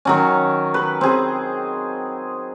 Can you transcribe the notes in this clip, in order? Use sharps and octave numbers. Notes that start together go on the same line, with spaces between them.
D#3 F#3 C#4
B4
C4 G#4